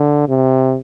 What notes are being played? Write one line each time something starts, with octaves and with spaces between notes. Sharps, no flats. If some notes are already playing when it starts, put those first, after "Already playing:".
Already playing: D3
C3